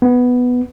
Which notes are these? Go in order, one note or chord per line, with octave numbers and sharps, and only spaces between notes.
B3